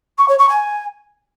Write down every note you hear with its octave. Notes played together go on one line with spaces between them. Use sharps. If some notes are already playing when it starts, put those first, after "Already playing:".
C#6
C#5
C#6
G#5